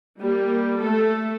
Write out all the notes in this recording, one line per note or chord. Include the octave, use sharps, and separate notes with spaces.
G3 A#3
A3 A4